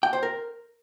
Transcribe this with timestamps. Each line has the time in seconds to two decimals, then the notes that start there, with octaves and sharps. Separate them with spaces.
0.03 G5
0.13 C5
0.23 A#4